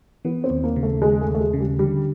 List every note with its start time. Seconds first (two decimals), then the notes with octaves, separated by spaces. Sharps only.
0.25 E3 B3
0.44 C4
0.50 D#2
0.64 A#3
0.76 C#3
0.83 A3
1.02 D#2 G#3
1.21 A3
1.27 D#2
1.35 A3
1.40 G#3
1.53 C#3
1.60 G3
1.79 D3 G3